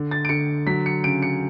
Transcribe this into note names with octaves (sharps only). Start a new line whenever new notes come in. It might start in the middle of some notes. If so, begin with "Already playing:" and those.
Already playing: D3
A6
D7
D3 C#7
F#3 B6
C#7
C#3 D7
C#7